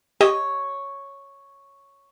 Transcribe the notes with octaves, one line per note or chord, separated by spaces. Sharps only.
G4 C#5 D#5